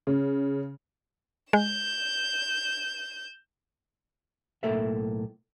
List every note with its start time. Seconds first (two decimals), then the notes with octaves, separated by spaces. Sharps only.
0.07 C#3
1.53 G#3 G6 E7
4.63 B1 A2 A#3 A4 E5